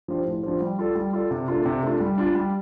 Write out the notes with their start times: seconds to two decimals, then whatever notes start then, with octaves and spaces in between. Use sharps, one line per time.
0.08 F3 D4 G4 C5
0.26 A2
0.43 F3 D4 G4 C5
0.61 G3
0.79 F4 A4 D5
0.95 G3
1.13 F4 A4 D5
1.31 C3
1.48 A3 D4 F4
1.66 C3
1.83 A3 D4 F4
2.00 G3
2.18 D4 F4
2.35 G3